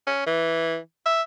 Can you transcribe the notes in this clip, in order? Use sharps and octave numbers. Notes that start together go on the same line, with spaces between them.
C#4
E3
E5